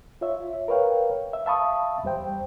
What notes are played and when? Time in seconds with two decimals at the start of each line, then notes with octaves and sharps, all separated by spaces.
0.21 F4 C#5 E5
0.68 A#4 B4 C#5 F5 G5
1.33 E5
1.46 E5 F5 A5 B5 C#6 D#6
2.03 E2 G3 C5 G5